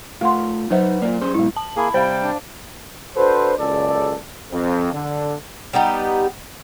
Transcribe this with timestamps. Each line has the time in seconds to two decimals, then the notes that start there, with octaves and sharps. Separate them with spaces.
0.21 A3 F4 F5 F#5 C6
0.70 F#3 D#4 B4 C5 E5 F#5
1.02 A#3 F4 D5
1.21 C#4 G#4 C5
1.34 G#2 B2 G#3 E4
1.56 A5
1.76 A#3 E4 G#4
1.94 C3 G3 C5 F5 G5
2.22 D4
3.16 D4 F#4 A4 B4 C5
3.59 F#1 C#2 A4 D5
4.52 F2
4.93 D3
5.73 G3 B3 D#4 G4